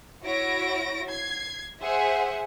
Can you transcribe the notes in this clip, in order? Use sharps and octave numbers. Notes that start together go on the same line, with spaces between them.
E4 F#4 C#5 A#6 D7
G#6 C7
G#4 C5 E5 F#5